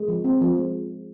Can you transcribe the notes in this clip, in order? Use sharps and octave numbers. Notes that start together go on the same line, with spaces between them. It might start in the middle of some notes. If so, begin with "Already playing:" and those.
Already playing: G#3
F3
C4
F3
G#3